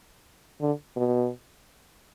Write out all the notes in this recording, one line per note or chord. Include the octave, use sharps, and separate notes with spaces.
D3
B2